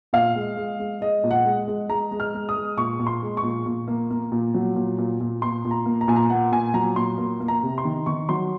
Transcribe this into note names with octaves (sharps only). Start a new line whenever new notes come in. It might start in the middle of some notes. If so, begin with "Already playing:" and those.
A#2 F5
G#3
G#3
G#3
G#3 D#5
A#2
F#5
G#3
G#3
G#3 A#5
G#3
F6
G#3
D#6
G#3
A#2 C#6
A#2
C6
G#3
C#6
A#2
A#2
A#3
A#3
A#2
F#3
A#2
A#2
A#2
A#2 C6
A#2
A#5
A#3
A#5
A#2 G#5
A#5
A#3 F#5
A#2 G#5
F#3 A#5
A#2 C6
A#3
A#3
A#5
C3
C6
D#3
D#3 C#6
F#3 C6